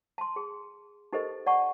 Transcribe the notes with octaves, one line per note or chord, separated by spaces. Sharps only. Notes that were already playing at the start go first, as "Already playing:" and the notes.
A5 C6
G#4
D#4 G4 A4 A#4 C5 D#5
D5 F#5 A5 C#6